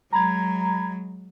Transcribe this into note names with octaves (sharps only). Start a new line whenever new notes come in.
F#3 G#3 A#5 B5 G#6